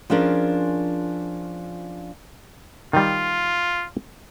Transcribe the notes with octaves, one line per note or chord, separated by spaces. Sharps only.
F3 C#4 D4 F4 G#4 A#4
D#3 G3 F4